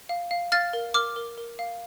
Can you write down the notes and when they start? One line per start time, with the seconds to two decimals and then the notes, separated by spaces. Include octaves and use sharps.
0.09 F5
0.31 F5
0.52 F5 F6 A6
0.73 A#4
0.94 A#4 D6 F6
1.16 A#4
1.38 A#4
1.59 F5